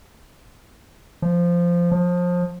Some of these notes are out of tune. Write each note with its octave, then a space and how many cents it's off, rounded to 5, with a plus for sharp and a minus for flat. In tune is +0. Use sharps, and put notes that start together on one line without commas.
F3 -10
F3 +25